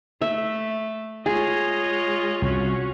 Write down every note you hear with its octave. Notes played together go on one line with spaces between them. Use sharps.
A3 E5
G#3 F4 G#4 C#5 D#5
C2 C#4 F#4